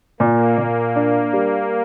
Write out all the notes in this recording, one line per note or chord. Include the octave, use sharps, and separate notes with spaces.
A#2 A#3
A#2
D4
G3